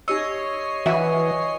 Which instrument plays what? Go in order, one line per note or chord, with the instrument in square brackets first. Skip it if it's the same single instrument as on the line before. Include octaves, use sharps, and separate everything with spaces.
[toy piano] D#4 G4 E6 [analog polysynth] C#5 D#5 C7
[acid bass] E3 [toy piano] F#4 [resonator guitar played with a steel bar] E5 F#5 G#5